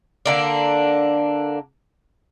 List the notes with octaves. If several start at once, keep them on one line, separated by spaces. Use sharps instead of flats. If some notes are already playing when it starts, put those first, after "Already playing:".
D3 A#3 D4